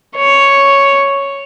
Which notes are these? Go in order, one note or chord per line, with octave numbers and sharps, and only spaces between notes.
C#5